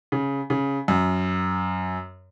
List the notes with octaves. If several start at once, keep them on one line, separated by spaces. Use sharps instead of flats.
C#3
C#3
F#2